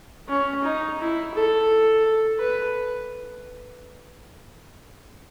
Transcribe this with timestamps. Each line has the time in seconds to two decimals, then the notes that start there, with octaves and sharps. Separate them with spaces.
0.29 C#4
0.64 D#4
0.99 E4
1.34 A4
2.39 B4